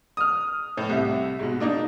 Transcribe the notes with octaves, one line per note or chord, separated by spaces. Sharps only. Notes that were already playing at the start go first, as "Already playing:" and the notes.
D#6 F6
A2
C2 E5
G#2 B2
A#3 D4 D#4